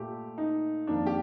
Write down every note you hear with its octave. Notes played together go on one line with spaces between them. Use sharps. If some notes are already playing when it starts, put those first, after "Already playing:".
Already playing: A#2 A3 G4
D#4
F2 D#3 A#3 D4
G4